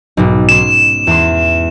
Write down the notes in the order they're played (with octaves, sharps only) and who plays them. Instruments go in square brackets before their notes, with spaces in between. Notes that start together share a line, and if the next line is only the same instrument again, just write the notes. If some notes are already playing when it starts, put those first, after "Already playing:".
[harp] B1 G#2 B2
[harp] C#4 C6 [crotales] E7
[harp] E2 C6